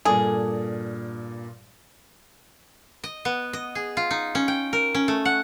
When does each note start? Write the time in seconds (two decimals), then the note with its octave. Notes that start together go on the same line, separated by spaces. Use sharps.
0.05 G2 A#2 G#4 A4 D5
3.04 D#5
3.25 B3
3.53 D#5
3.75 G#4
3.97 F4
4.11 D#4
4.35 C#4
4.48 G5
4.73 A#4
4.95 C#4
5.08 A3
5.25 F#5